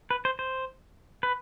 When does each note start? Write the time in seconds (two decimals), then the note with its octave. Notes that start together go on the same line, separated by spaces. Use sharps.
0.11 B4
0.25 C5
0.39 C5
1.23 B4